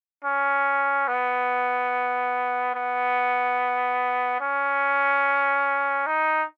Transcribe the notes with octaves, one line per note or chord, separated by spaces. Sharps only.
C#4
B3
B3
C#4
D#4